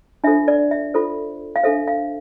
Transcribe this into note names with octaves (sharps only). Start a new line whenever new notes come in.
D4 F4 A4 C5 E5
D5
E5
F4 A4 C5
F5
D4 A4 C5 E5
F5